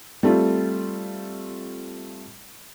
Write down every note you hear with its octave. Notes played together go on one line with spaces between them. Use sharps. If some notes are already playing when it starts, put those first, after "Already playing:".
G3 A3 C4 F4